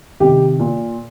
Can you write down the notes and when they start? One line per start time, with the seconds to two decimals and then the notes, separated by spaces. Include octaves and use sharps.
0.20 C3 D#3 G4
0.59 A#2